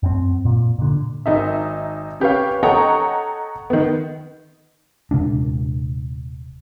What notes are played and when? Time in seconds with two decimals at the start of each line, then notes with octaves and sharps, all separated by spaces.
0.03 F#2 C4
0.45 A#2
0.79 A#2 D3
1.26 G#1 D#4 E5
2.20 C#4 G4 B4 C#5 F5
2.63 A4 C#5 D#5 F#5 G5 A#5
3.70 D#3 B3
5.11 D#1 C3 G#3 D4